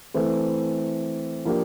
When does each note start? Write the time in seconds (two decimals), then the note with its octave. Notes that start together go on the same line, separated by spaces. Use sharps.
0.14 E3 A3 C4
1.45 F3 A#3 D4 G4